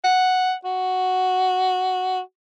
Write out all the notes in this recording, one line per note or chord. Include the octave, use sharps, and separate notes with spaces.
F#5
F#4